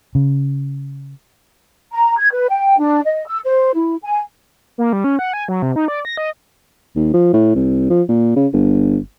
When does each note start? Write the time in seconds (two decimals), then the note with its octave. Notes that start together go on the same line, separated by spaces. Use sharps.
0.15 C#3
1.92 A#5
2.18 G#6
2.32 B4
2.50 G5
2.79 D4
3.05 D#5
3.26 E6
3.45 C5
3.75 E4
4.03 G#5
4.78 A#3
4.93 G3
5.04 C#4
5.19 F#5
5.33 G#5
5.48 F#3
5.62 C3
5.76 D#4
5.88 D5
6.05 A#6
6.17 D#5
6.96 D#2
7.14 F3
7.34 A2
7.55 C2
7.90 F3
8.09 A#2
8.36 C#3
8.53 G1